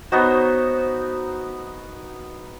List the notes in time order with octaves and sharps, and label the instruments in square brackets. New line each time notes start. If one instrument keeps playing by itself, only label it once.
[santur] B3 D#4 F#4 [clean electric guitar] C5 C#5